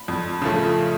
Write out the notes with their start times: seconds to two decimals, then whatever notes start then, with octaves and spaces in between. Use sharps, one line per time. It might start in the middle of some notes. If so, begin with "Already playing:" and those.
Already playing: B5
0.08 F2
0.42 C#3 F3 A3